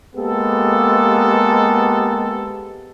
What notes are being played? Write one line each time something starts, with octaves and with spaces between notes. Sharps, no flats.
G#3 A#3 B3 G4 A4